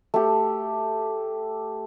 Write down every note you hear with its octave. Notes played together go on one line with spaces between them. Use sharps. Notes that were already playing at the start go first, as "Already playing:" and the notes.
A3 G4